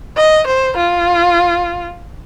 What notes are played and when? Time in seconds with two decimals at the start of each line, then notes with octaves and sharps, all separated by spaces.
0.17 D#5
0.46 C5
0.77 F4